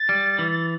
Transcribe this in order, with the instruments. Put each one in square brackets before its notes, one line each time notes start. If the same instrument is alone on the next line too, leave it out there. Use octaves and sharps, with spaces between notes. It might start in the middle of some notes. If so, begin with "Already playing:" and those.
Already playing: [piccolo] A6
[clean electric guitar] G3
E3